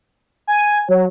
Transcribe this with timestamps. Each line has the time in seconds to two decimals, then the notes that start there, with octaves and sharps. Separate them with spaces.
0.47 G#5
0.89 F#3 C#5